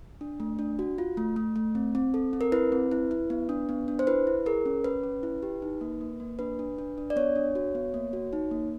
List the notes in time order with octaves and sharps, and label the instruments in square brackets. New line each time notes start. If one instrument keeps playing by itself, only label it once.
[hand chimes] D4
A3
D4
F#4
F4
A3
A3
A3
C4
C4
A4
C4
A#4
E4 B4
C4
E4
E4
B3
D4
B3
D4
C5
E4 B4
E4
G#4 A#4
C#4
C#4 B4
C#4
E4
G4
D#4
A#3
A#3
A#3
D4 B4
D4
D4
D4
D5
B3 C#5
D4
F#4
B3
A#3
F#4
D#4
A#3